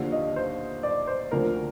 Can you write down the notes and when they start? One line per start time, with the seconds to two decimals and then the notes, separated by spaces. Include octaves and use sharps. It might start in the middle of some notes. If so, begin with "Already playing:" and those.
Already playing: D#2 D3 F3 F5
0.12 D#5
0.36 C5
0.83 D5
1.07 C5
1.31 D2 D3 F3 A#4